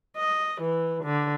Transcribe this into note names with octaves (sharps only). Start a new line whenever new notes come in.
D#5
E3
D3